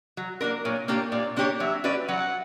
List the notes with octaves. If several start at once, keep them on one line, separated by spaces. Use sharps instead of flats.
F#3
A#3 D4 A#4
A#2 C#5
A#3 D4 G4 C#5
A#2 D5
A#3 D4 G4 C#5
F#3 E5
C#4 F#4 B4 D5
F#3 F#5